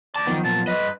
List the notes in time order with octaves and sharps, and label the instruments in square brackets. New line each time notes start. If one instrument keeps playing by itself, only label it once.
[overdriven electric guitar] D2 A5 [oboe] D5
[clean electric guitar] F#2 F3 B3 [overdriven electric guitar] D#3
[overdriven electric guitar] A#2 [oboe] A5
[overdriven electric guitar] G2 D#5 [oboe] B4